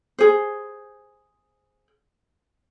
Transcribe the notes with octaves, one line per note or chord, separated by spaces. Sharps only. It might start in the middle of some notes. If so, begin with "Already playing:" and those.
G#4 C5